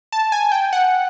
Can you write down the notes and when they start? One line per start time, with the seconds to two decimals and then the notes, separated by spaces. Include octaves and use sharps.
0.12 A5
0.32 G#5
0.52 G5
0.73 F#5